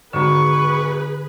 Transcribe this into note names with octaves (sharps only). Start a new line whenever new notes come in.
G#1 D3 F#3 G#4 B4 A#5 C#6